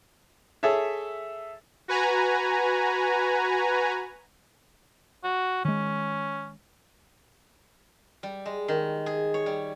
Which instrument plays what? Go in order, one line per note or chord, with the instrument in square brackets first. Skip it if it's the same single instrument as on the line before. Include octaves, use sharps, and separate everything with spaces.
[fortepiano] G#4 A4 C#5 E5
[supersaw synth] F#4 B4 G#5 A#5
[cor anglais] F#4
[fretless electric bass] D#3 G#3 [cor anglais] C#4
[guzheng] G3
G#3
D#3
G#4
C#5
G3